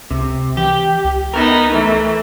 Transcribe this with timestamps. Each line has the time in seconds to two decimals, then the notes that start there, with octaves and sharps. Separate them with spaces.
0.11 C#2 C3
0.57 E3 G4
1.04 C#2
1.34 B3 D#4 A#4
1.71 E3 A3